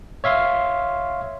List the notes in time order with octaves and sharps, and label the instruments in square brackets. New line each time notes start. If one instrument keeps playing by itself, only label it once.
[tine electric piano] C#5 E5 F5 C6